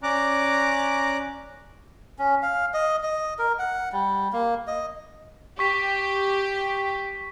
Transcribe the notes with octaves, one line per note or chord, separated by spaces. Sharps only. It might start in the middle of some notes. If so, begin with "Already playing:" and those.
C#4 D5 A#5 D6 F#6
C#4
F5
D#5
D#5
A#4
F#5
G3
A#3
D#5
G4 C#6 B6